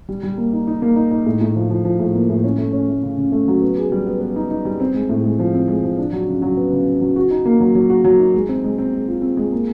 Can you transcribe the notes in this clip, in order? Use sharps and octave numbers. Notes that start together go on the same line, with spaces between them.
G3
G3
A#3
D#4
D#4
A#3
D#4
D#4
A2
A2
F3
F3
F3
A2
A#3
A2
C#4
A3
C#4
A3
C#3
C#3
A3
F#3
B3
G#4
G3
B3
B3
D#4
D#4
G3
C4
G#3
A2
G#3
F3
C4
G#3
F3
D4
F#3
C#3
F#3
B3
C#3
C#3
F#3
F#4
D#4
A#3
F#3
F#3
F#4
F#3
D#4
G#3
C4
G#3
C4
G#3
F4
C4
G#3
A#3